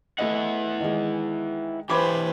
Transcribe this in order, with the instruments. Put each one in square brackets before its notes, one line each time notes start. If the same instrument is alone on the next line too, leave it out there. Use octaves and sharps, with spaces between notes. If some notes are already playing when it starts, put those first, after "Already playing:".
[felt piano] A3 D#5 [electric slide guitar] E4 B4 F#5
[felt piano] D#3 G#3
[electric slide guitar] E3 G4 [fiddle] B4 C5 [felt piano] B5 D6 G#6